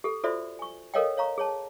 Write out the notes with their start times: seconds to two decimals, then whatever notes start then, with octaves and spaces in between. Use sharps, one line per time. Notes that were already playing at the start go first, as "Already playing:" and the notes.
0.04 G4 A4
0.24 F4 F#4 A4 C5 D5 E5
0.59 G#5 C#6
0.94 A4 A#4 C#5 D#5 F5 G5
1.17 C#5 F5 A#5 C#6
1.38 G#4 C#5 A5